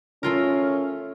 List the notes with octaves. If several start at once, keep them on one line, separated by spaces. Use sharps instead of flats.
A3 C#4 F4 A#4